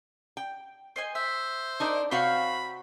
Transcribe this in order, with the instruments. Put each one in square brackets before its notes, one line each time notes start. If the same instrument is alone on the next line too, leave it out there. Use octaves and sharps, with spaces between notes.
[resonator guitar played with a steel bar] G5
[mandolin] C5 D#5 G#5
[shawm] C5 [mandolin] E5
[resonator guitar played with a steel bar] D4 D#4 A#4
[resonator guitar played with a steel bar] C3 C4 F#4 [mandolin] C5 C#5 F5 [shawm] B5